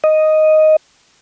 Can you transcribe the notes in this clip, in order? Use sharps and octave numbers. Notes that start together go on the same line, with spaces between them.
D#5